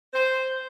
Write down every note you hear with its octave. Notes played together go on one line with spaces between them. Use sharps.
C5